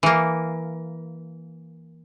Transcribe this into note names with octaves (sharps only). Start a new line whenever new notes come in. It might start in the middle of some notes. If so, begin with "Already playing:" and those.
E3 A#3